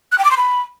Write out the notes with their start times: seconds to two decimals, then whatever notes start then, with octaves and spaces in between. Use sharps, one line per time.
0.12 F#6
0.18 G5
0.25 D6
0.31 C6
0.37 B5